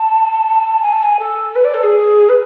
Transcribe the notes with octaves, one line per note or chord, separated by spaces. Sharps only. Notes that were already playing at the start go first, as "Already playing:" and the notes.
Already playing: A5
G#5
A5
G#5
A4
B4
D5
A4
G#4
B4